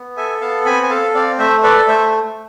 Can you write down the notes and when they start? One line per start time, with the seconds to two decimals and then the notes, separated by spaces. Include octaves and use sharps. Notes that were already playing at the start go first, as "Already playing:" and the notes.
Already playing: B3
0.17 A4 E5 G#5
0.41 B3 F5 A5
0.66 C4 G#5 B5
0.83 G#5
0.90 A4 F5 A5
1.14 C4 D5 F5
1.39 A3 C5 E5
1.63 A4 B4 D5
1.88 A3 C5 E5